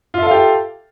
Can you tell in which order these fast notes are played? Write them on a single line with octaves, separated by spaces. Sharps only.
F4 E5 A4 F5 G4